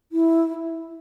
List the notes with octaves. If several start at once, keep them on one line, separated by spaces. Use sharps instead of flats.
E4